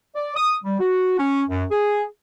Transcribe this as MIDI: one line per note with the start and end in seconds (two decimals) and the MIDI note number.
0.15 0.35 74
0.36 0.56 87
0.63 0.79 55
0.80 1.18 66
1.19 1.42 61
1.49 1.64 42
1.71 2.04 68